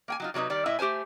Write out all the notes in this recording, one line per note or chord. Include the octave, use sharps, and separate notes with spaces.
A#3 G5 G#5
F#3 D#4 F4
C3 F#3 G3 D#4 B4
D#3 G3 D5
A2 E4 D#5 E5
A3 G4 A#4 C5 G#5